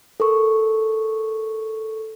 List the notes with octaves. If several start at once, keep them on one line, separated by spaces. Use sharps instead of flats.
A4 A#4 C#6